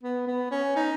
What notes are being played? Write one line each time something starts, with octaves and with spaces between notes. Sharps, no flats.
B3
B3
C#4
D#4